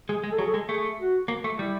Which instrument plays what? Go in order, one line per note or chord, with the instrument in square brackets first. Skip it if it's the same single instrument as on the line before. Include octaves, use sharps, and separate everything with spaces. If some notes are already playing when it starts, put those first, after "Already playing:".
[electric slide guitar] G#3 [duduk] G#4
[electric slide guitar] G#3
[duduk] A4
[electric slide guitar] F#3 [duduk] G#4
[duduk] A4
[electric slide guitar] G#3
[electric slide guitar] A3 [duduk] G#4
[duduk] F#4
[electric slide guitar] A#3
A3
[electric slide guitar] G3 [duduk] E4